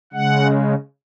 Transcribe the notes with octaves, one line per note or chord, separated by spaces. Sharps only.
C#3 G#3 F#5